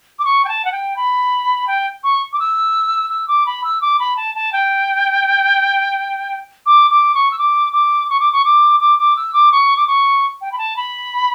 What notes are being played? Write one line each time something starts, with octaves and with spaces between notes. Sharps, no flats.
D6
C#6
G5
A5
F#5
G5
B5
G5
C#6
D6
E6
E6
D6
B5
E6
D6
B5
A5
A5
G5
D6
D6
C#6
E6
D6
D6
C#6
D6
C#6
D6
D6
D6
E6
D6
C#6
D6
C#6
G5
B5
A5
B5